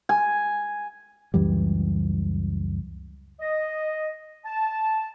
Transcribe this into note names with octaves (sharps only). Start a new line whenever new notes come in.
G#5
C#2 F#2 E3 G3
D#5
A5